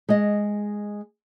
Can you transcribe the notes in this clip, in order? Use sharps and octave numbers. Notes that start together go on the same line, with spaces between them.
G#3 D#5